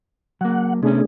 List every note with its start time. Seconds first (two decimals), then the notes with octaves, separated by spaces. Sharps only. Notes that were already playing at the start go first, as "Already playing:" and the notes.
0.41 F#3 A#3 F#5
0.83 C3 A3 B3 C#4 D4 G#4